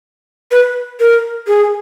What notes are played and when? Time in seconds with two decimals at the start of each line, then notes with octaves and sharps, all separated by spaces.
0.51 B4
1.00 A#4
1.47 G#4